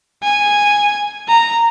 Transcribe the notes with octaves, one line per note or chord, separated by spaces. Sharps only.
G#5
A#5